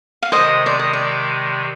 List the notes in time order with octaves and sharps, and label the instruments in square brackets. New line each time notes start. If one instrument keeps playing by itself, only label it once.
[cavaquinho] F5
[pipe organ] C3 D#3 G#3 [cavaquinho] C5 D#5
[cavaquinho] D5
D#5
D5